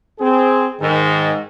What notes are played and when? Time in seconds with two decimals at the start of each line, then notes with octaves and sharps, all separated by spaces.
0.19 C4 G#4
0.80 G#2 D#3